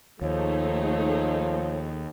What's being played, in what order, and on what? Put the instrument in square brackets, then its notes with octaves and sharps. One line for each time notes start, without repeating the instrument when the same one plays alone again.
[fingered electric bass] D#2 [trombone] F3 [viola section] A3 D#4 G#4 [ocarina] C#5